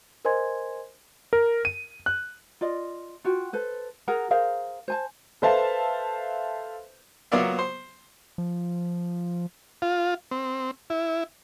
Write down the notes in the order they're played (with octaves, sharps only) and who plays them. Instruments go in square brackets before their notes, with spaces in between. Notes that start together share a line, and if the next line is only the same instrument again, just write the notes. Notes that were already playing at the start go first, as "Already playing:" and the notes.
[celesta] A#4 C5 D#5 G#5 C6 G#6
[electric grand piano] A#4
D#7
F#6
[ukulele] F4 D5 D#5
F4 F#4 G5
A4 B4 C5
G#4 A#4 F#5 A#5
G#4 A#4 C5 F5
C5 G#5 A5
[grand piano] A4 B4 C5 E5 F5 A5
[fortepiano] F#3 A#3 B3 F4 D5 E5
C5
[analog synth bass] F3
[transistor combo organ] F4
C4
E4